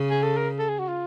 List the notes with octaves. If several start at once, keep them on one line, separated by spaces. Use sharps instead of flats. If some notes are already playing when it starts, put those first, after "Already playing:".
Already playing: C#3
G#4
A4
A#4
A4
G#4
F#4
F4